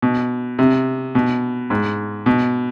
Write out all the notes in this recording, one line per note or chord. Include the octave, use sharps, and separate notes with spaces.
B2
C3
B2
G#2
B2